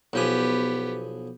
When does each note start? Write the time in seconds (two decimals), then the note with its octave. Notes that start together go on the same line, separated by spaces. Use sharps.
0.13 B1 F3 B3 G4 G#5